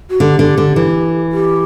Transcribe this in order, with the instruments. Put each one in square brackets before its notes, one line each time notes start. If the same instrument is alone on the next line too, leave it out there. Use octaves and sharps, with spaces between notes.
[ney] F#4
[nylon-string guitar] D3 [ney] G4
[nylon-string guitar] D3
D3
E3
[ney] G4